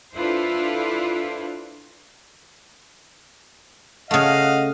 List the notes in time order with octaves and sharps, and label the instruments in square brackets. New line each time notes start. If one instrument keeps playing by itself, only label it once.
[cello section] D4 E4 F4 A4 B4 C5
[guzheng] C#3 A3 [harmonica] D#5 F5 F#5